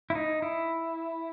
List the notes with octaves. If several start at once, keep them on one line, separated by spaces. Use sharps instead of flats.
E4
D#4
E4